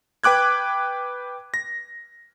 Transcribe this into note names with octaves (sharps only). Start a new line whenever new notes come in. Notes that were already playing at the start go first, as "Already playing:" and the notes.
B4 G5 D6 F#6 G#6
A#6